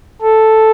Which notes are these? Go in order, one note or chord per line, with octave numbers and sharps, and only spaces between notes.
A4